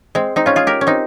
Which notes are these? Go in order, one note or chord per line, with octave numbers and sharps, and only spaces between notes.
G#3 C4
C4 D#4
C#4 F4
F4 G#4
G4 A#4
C#4
C4 D#4